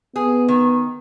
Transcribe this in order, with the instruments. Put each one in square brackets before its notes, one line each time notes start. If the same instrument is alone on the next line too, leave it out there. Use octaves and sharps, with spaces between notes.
[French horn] B3 [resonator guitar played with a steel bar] G#4
[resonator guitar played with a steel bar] D#3